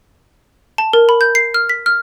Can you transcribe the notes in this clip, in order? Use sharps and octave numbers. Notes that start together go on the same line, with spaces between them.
A5
A#4
B5
G6
C7
F6
B6
F6